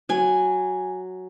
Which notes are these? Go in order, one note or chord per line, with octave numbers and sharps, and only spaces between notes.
F#3 G#5